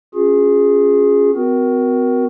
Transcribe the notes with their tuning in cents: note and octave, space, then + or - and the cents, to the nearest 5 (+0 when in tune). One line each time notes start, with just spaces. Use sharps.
C#4 +0 F4 +40 G#4 +0
C4 -45 F#4 +0 A#4 +20